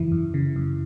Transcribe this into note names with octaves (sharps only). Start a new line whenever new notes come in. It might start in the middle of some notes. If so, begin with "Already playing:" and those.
Already playing: F#2 C#3 E3 E4
F#2
C#3
F#2